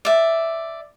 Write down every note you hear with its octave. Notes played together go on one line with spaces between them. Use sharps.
D5 E5